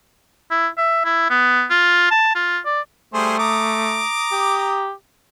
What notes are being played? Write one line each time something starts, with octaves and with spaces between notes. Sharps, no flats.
E4
E5
E4
B3
F4
A5
F4
D5
G3 A3 G#4 C5
A#5 D6 D#6
G4